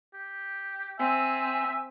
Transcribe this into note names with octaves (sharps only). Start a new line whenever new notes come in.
G4
C4 E5 G#5